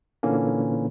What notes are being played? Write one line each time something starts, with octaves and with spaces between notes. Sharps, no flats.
A#2 D3 E3 A#3 C#4